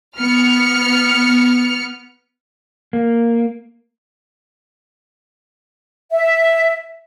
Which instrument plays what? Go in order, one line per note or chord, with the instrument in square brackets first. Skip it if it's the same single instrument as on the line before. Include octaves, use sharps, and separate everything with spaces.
[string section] B3 F6 C#7
[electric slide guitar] A#3
[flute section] E5